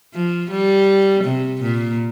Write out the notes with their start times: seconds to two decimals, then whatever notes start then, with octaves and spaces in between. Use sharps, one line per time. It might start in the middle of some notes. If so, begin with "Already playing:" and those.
0.14 F3
0.51 G3
1.24 C3
1.62 A#2